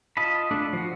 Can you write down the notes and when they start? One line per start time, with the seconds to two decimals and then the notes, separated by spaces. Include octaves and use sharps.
0.17 F4 D#5 A5 B5
0.51 A3 D4 A4
0.73 F3 F#4